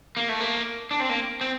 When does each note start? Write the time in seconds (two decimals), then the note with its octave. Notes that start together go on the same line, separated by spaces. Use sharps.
0.17 A#3
0.29 A3
0.40 A#3
0.91 D4
1.00 C4
1.09 A#3
1.41 C4